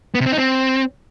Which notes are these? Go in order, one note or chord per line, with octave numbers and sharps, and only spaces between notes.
B3
C3
C4
D#4
C4